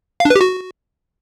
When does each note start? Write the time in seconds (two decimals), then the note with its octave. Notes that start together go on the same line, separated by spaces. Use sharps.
0.20 F5
0.25 D4
0.30 B4
0.36 G4
0.41 F#4